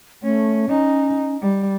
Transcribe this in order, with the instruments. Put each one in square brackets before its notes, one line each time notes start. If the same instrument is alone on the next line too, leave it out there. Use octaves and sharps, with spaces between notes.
[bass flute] A3 [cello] C#4
[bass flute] C#4 [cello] D#4
[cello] G3